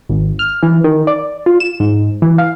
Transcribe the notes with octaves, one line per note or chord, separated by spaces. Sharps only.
G#1
F6
E3
D#3
D5
F4
E7
G#2
E3
F5